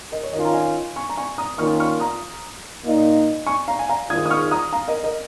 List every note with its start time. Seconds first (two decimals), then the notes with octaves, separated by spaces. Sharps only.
0.12 A#4 D#5
0.23 C#5
0.33 D#3 C#4 F4 A#4 D#5
0.45 A#5
0.54 D#5 G#5
0.96 G#5 C#6
1.09 A#5
1.17 G#5 C#6
1.38 A#5 D#6
1.58 D#3 A#3 C#4 F4 C#6 F6
1.80 C#6 F6
2.00 A#5 D#6
2.84 A#2 A#3 D#4
3.46 G#5 C#6
3.68 F5 A#5
3.79 G#5
3.89 F5 A#5
4.10 G#2 D#3 G#3 F4 D#6 G#6
4.26 D#6
4.30 C#6 F6
4.51 A#5 D#6
4.73 F5 A#5
4.88 A#4 D#5
5.03 A#4 D#5